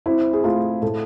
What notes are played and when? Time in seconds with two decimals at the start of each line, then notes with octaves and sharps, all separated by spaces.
0.06 C4 E4
0.33 G#4
0.44 A3 F4
0.82 A2 A4